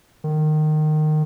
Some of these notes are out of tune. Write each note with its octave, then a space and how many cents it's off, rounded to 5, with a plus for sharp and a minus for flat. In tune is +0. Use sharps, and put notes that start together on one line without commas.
D#3 -20